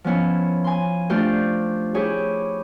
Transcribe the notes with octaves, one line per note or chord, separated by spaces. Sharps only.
F3 B3 C#4 E4
G#5 C6
A3 D4 F4 G4 C5
E4 G4 G#4 C#5